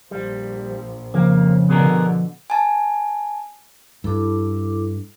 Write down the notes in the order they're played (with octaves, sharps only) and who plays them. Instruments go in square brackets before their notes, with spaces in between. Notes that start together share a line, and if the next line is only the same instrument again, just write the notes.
[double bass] A#1 F3 [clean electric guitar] G3
[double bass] F2 [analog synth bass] C#3 [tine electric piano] F3 [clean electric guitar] A#3
[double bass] B2 D3 [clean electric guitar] B3 G#4 A#4
[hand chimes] G#5 A5
[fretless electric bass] G2 [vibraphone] E4 A4 D6